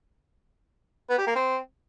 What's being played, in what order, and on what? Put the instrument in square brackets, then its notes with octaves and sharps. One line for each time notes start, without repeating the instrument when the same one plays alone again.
[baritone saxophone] B3
G4
A#3
C4